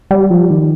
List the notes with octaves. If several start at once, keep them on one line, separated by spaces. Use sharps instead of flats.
G3
F3
D#3